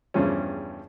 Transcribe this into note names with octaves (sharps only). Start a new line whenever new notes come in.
E2 G2 C#3 F3 G3 C#4